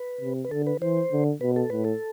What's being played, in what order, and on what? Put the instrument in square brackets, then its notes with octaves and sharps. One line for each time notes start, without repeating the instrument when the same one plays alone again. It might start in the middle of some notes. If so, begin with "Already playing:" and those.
Already playing: [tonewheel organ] B4
[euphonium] C3
[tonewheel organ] B4
[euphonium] D3 [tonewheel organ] A4
[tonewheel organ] B4
[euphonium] E3 [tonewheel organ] C5
[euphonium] D3
[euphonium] B2 [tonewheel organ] B4
[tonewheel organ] A4
[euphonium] A2 [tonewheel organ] B4
[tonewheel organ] A4